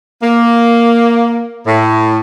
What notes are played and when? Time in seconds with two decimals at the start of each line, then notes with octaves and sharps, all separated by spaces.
0.22 A#3
1.66 A2